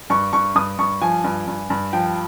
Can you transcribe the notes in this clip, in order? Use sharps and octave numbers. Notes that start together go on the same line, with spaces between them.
G2 C#6
G2 C#6
G2 D#6
G2 C#6
F3 G#5
G2
G2
G2
F3 G5